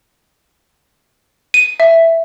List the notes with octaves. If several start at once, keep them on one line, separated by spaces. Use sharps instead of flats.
D#7
E5